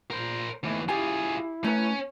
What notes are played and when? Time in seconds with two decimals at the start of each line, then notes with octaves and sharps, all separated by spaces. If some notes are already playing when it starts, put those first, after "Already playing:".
0.11 A#2 A#4 C5
0.63 D#2 E3 A3
0.89 E4 F4 G4 G#4 G#5
1.64 A3 C#4 B4